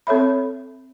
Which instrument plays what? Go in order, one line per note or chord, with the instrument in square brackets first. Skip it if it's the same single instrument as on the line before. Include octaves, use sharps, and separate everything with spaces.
[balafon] C4 A4 C#5 E5 B5